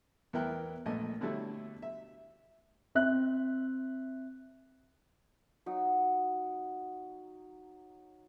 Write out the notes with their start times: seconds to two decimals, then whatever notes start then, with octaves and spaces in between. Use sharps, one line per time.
0.33 E2 B3 E4 A#4 G5 F#6
0.86 A#1 A#2 A3 D#5
1.21 B2 D3 F#3 G3 A3 E4
1.82 E5
2.95 C4 E5 F#6
5.66 F#3 D#4